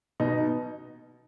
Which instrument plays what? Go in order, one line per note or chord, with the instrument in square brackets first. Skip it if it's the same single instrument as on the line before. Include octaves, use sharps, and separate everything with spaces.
[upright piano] B2 D#4